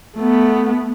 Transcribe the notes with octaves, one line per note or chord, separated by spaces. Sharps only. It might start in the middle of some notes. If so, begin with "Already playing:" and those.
A3 B3